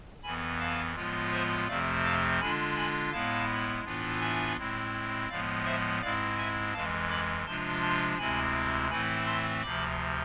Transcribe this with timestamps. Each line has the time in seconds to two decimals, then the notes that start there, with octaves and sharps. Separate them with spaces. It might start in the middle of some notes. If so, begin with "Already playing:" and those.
0.23 F2 E3 B3 G#5 B5
0.60 F5 A5
0.96 A2 F3 G#3 B3 F4
1.32 C5 E5
1.68 F2 C3 F3 A3 C4 D5 F5
2.04 F5 A5
2.40 D3 G#3 D4 F4 G#5 B5
2.76 G#5 B5
3.12 A2 G#3 B3 E4 F5 A5
3.84 A2 E3 B3 D4 F4
4.21 E5 G#5
4.57 A2 G#3 C4 E4
5.29 A2 F3 G#3 B3 D5 F5
5.65 C5 E5
6.01 G#2 G#3 C4 E4 D5 F5
6.37 E5 G#5
6.73 F2 E3 G#3 F5 A5
7.10 B5 D6
7.46 C3 F3 G#3 D4 F4 A5 C6
7.82 A5 C6
8.18 D2 C3 G#3 C4 E4 G#5 B5
8.90 A2 E3 A3 C4 E4 G#5 B5
9.26 A5 C6
9.62 D2 C3 F3 B5 D6